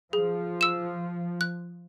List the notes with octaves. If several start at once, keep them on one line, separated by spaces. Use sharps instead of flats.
F3 G#4
E6 E7
F#6